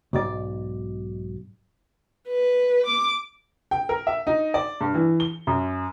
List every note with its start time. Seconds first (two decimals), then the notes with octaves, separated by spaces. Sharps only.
0.13 B1 G#2 D5
2.28 B4
2.86 D6
3.71 G5
3.89 A#4
4.07 E5
4.27 D#4
4.54 D5
4.81 G2
4.94 E3
5.20 G7
5.47 F#2